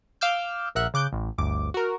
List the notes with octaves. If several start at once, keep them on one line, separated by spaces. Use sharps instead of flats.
F5 D6 E6 F6 G6
A#1 A#4 E5 F#5 F#6
C#3 D6 F#6 G6
A1
G1 D2 D6
F#4 A#4